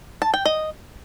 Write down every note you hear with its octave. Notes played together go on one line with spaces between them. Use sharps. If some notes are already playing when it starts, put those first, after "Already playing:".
A5
G5
D#5